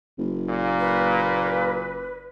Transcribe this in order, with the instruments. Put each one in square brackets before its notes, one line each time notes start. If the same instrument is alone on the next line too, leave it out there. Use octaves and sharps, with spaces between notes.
[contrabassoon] F#1
[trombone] A#2
[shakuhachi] B4